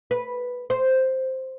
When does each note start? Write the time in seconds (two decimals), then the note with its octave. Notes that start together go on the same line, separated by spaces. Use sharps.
0.11 B4
0.70 C5